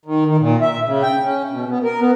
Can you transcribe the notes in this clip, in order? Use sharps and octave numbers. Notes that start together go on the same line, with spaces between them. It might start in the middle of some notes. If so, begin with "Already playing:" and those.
D#3
D#3
A#2
E5
C#3
G5
C#4
B2
B3
A#4
B3